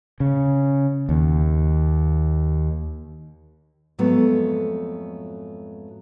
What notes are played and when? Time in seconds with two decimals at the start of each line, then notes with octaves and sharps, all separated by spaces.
0.20 C#3
1.09 D#2
3.99 F2 G#2 F#3 A3 B3